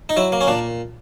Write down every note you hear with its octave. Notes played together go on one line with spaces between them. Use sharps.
D#4
F#3 E4
A#3
C#4
A#2 D4